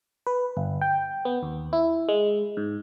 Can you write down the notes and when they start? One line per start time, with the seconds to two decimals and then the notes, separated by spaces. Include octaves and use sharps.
0.27 B4
0.57 G1
0.81 G5
1.25 B3
1.43 D#2
1.73 E4
2.09 G#3
2.57 G#2